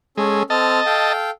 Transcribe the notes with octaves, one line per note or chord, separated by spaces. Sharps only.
G#3 C#4 A4
C4 A4 D#5 A5 F6
A4 F5 G5